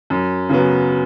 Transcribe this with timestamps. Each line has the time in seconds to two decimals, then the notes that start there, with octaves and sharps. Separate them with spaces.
0.10 F#2
0.49 C#3 F#3 B3